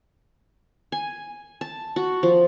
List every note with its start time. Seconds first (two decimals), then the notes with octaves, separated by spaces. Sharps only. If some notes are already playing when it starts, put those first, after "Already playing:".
0.92 G#5
1.61 A5
1.96 F#4
2.23 F3